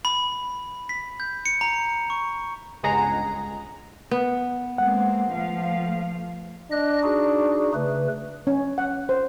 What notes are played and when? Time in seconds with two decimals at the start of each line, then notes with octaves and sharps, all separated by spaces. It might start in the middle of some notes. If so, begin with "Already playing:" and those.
0.05 B5
0.89 B6
1.20 G6
1.46 C#7
1.61 A#5
2.10 C#6
2.83 G1 C#2 G#3 G#4 F#5 A#5
4.11 B3
4.78 G#3 A#3 C4 F#5
5.32 F3 A3 F5
6.72 D4 D#5 F#6
7.03 D#4 F#4 G#4
7.74 C#3 A3 B4
8.47 C#4
8.78 F#5
9.09 C5